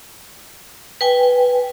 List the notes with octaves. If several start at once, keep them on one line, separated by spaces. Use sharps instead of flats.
B4 G5 G#5